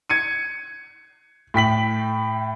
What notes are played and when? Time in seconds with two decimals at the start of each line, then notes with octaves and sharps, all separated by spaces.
0.10 G#6 C#7 D#7
1.54 A2 G5 B6 F#7